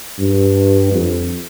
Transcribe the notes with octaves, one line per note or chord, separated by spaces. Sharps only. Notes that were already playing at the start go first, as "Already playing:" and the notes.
G2
F2